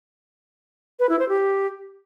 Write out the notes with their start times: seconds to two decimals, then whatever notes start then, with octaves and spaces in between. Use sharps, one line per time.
0.99 B4
1.09 E4
1.19 C5
1.29 G4